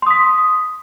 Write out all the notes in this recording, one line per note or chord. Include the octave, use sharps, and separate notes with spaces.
C6 D#6 B6